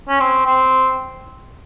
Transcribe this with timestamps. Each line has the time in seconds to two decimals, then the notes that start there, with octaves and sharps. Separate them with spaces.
0.09 C#4
0.20 C4
0.46 C4